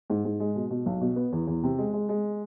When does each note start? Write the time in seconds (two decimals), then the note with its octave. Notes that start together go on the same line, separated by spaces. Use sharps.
0.10 G#2
0.25 G#2
0.40 G#3
0.56 B2
0.71 B2
0.86 B1
1.01 B2
1.16 B3
1.32 E2
1.47 E2
1.63 C3
1.78 G#3
1.93 G#3
2.09 G#3